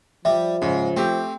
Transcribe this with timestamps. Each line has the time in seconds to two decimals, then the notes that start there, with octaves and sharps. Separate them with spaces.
0.25 F3 G3 E5
0.62 G#2 C#3
0.97 A3 C4 G4